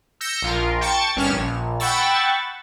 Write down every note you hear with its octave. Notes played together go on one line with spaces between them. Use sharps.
E6 G6 A#6 C#7
A#1 F4 A#4
G5 A5 C#6 A6 C#7
G#1 G2 C#4 C#5 F6 E7
A#1
F#5 G5 B5 C#6 E6 A6